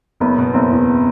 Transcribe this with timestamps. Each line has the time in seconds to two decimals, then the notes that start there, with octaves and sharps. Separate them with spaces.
0.20 F#1 B3
0.38 B2
0.54 F#1 C4
0.71 E2